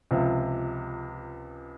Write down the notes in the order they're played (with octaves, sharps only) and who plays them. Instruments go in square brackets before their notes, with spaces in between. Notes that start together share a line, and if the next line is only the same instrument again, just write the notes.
[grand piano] C#2 C3 F3